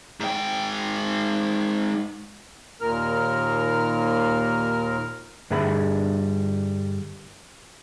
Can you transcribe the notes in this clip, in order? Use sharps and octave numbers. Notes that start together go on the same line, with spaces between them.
G#2 G5
D#2 A#2 A#4 F6
G2 D3 G3 G#4 E5 B5